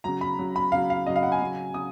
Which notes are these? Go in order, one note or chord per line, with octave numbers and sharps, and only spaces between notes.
C#3 F#3 A#5
B5
C#3 F#3
B5
C#3 F#3 F5
F5
C#3 F#3 D#5
F5
F#5
G#5
C#3 F#3
C#3 D#6